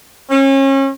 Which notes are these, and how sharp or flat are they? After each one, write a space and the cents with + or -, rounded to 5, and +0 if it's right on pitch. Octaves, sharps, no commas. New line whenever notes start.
C#4 -35